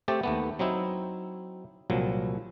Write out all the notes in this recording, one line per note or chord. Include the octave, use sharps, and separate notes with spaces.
A3 C4 G4 A5
D#2 A3 B3
F#3 C4 D#4 E4
C2 A#2 F3 F#3